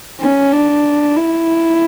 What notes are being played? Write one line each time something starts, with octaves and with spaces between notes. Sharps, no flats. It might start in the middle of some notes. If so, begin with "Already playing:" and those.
C#4
D4
E4